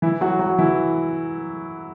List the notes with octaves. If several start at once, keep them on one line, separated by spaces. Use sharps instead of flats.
E3 E4
F#3 F#4
F#3 F#4
E3 E4